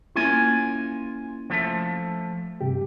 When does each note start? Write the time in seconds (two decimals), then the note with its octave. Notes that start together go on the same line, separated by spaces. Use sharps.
0.16 A#3 C#4 E4 F4 G#5
1.50 F3 A3
2.61 G2 C3 G4